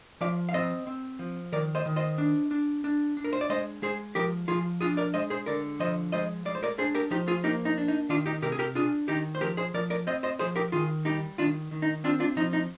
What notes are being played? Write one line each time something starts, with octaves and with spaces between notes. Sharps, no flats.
F3 D5 F5
F5
C4 C5 D#5
C4
F3
D#3 A#4 D5
C5 D#5
D#3
C5 D#5
D4
D4
D4
D4
A#4
C5
D5
G#3 C5 D#5
G#3 G#4 C5
F3 G4 A#4
F3 F4 G#4
D4 F4 G#4
A#4 D5
G#3 C5 D#5
G#4 C5
D3 A#4 D5
F3 C5 D#5
G#3 C5 D#5
G#3 D5
C5
A#4 D5
D4 G#4 C5
G4 A#4
F3 D#4 G4
F4 G#4
A#3 D#4 G4
D#4
D4
D#4
D#3 D4 F4
D#4 G4
C3 G4 A#4
G#4
G4 A#4
D4 F4 G#4
D#3 D#4 G4
C5
F3 G4 A#4
G#4 C5
F3 A#4 D5
A#4 D5
C4 C5 D#5
C5 D#5
F3 G#4 C5
G4 A#4
D#3 F4 G#4
G3 D#4 G4
D#3 D4 F4
D#3
D#4
C4 D4 F4
D4 F4
F3 D#4
D#4